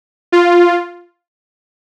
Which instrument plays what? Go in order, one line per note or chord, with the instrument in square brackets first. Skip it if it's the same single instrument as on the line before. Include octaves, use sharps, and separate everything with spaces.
[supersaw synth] F4